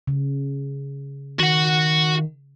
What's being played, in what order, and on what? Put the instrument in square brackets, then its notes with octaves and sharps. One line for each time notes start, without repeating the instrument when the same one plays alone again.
[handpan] C#3
[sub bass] D#3 [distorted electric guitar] F#4 F#5